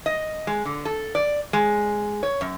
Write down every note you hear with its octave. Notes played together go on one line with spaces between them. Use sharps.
D#5
G#3
D3
A4
D5
G#3
C#5
F#2